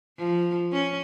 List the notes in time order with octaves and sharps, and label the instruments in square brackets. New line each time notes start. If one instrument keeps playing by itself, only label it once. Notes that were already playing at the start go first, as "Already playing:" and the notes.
[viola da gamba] F3
C#4